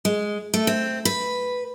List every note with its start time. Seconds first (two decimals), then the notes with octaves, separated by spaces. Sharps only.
0.05 G#3
0.54 A3
0.67 C4
1.05 B4